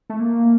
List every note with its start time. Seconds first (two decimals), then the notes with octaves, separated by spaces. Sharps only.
0.10 A3
0.20 A#3